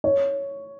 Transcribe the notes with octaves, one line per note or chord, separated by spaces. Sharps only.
C#5